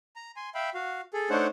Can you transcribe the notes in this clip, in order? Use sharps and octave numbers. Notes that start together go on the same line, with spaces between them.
A#5
G#5 C6
E5 F5 G5 B5
F#4 F5
G#4 A4
A3 D4 D#4 C5 C#5 F#5